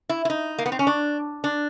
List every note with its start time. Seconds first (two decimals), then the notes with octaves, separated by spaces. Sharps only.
0.09 E4
0.25 E4
0.30 D#4
0.58 A#3
0.66 B3
0.72 C4
0.79 C#4
0.87 D4
1.44 D4